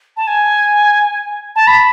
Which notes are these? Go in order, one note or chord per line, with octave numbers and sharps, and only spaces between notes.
A5
G#5
A5
B5